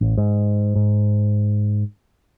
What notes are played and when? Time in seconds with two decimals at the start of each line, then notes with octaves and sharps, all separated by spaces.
0.01 A1
0.17 G#2
0.75 G#2